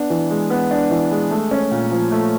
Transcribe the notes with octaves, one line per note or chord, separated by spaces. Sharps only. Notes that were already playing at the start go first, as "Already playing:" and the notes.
Already playing: B3 D4
E3
G#3
B3
D4
E3
G#3
A3
C#4
A#2
F3
A3